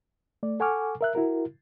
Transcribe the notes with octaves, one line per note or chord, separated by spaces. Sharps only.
A3 D5
A4 F#5 G#5 C#6 D6 F6
A#4 E5 F#6
E4 F#4 A#4